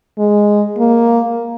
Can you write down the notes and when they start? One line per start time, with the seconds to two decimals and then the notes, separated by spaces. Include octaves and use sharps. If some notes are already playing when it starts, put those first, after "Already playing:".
0.18 G#3
0.78 A#3